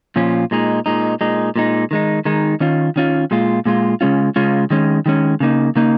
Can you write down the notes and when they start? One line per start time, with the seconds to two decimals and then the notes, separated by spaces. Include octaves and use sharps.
0.16 A#2 F3 C#4 F4
0.51 A#2 G#3 D#4
0.86 A#2 G#3 D#4
1.21 A#2 G#3 D#4
1.56 A#2 G#3 D#4
1.91 D#3 G#3 D#4
2.25 D#3 G#3 D#4
2.60 D#3 C#4 F4
2.96 D#3 C#4 F4
3.31 A#2 G#3 F4
3.66 A#2 G#3 F4
4.01 C#3 G#3 C#4 F4
4.36 C#3 G#3 C#4 F4
4.70 D#3 G#3 C#4
5.06 D#3 G#3 C#4
5.40 C#3 A#3 D#4
5.76 C#3 A#3 D#4